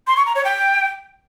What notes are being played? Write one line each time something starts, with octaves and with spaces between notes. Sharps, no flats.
C6
C#6
A#5
C#5
G5